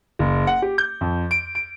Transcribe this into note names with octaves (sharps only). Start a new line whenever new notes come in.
F#1
F#5
G4
G6
F2
D7
D7